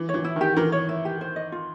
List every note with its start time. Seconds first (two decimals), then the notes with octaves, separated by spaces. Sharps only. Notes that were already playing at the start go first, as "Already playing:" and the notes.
Already playing: E3
0.09 C#5
0.14 E3
0.24 E4
0.36 D#3 G4
0.57 E3 A#4
0.72 C#5
0.89 E4
1.05 G4
1.21 C5
1.36 D#5
1.52 F4